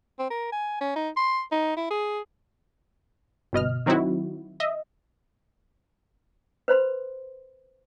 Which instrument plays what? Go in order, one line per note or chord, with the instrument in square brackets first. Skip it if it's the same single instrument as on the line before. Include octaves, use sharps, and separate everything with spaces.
[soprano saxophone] C4
A#4
G#5
C#4
D#4
C6
D#4
E4
G#4
[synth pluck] G1 B2 D#5 F6
D#3 F#3 C4 D#4 E4 F#4
D#5 E5
[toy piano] B4 C5 B5 C6